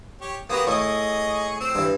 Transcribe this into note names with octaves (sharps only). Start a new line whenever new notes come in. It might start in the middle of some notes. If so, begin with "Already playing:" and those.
G4 C#5
F#3 A#3 B3 F#4 G4 D#6
A2 G#4 D#5 C#6 D#6
C4 E6
G2 E3